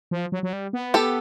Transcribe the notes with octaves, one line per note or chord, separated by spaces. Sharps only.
F3
F#3
F#3
G3
B3
G4 A4